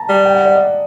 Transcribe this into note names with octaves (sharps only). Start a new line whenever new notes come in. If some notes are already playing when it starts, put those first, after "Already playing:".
Already playing: A5 A#5
G3
G5
F#5
D5
D#5